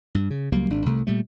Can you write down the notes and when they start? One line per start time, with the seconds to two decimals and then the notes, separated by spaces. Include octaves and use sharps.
0.15 G2
0.30 C#3
0.52 C#2 F#3 G3 A#3
0.70 G#1 D4
0.86 C2 C3 A3
1.07 A#2 G3 A3